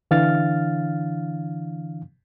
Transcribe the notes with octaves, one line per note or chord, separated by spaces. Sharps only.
D3 E3 D4 F5 F6 A6